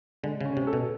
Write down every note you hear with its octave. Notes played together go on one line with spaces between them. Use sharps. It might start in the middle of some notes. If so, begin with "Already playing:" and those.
D3 G#3
C#3 C#4
C3
A4
B2